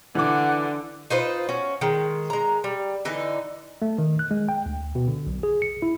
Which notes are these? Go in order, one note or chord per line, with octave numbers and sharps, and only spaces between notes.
D3 E3 F#5 D6
D#4 F4 B4 C5
C#4 F#4
D#3 G#3
G#3 A#5
G3
D3 E3 D#4
A3
D#3
F#6
G#3
G5
D2
B2
D3
B1
G#4
C#7
E4